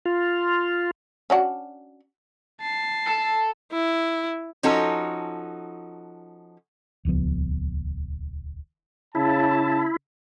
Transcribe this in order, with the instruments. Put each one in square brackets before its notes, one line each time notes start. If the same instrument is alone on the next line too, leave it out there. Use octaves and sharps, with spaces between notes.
[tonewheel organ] F4
[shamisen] C#4 D4 F#4
[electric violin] A5 C7
[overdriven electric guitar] A4
[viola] E4
[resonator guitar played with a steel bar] F3 C#4 D#4 F#4 A4
[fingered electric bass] D#1 C#2 F3 B3
[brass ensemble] C#3 A5 [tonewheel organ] E4